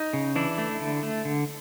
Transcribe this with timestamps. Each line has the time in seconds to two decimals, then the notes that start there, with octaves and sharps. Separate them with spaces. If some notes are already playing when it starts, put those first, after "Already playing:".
Already playing: D#4
0.13 C#3
0.36 E3 D4 E4
0.58 A3
0.80 D3
1.03 A3
1.25 D3